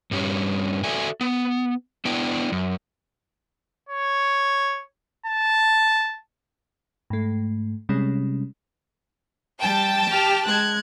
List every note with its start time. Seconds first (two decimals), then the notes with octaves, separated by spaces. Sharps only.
0.11 G2 G3 C#4
0.83 F#4 A4 D5 E5 G#5
1.21 B3
2.05 B3 D4 E4 G5
2.52 F#2
3.89 C#5
5.26 A5
7.10 G#2 A3
7.89 C3 G3 G#3 C#4
9.61 G3 G5 A5
10.08 G4 F6
10.47 G#3 F#6 G#6